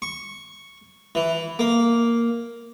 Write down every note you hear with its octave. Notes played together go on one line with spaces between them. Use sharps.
C#6
E3
A#3